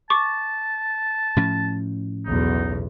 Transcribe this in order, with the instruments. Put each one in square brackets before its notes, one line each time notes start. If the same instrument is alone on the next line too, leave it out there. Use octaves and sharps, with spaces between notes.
[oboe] A5 [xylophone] C#6 D6
[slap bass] A2 F3 C#4
[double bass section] B1 E2 [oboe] D#4